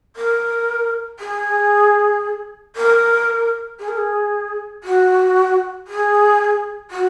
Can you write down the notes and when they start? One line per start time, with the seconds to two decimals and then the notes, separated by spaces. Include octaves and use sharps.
0.16 A#4
1.19 G#4
2.76 A#4
3.79 G#4
3.88 A#4
3.97 G#4
4.83 F#4
5.87 G#4
6.90 F#4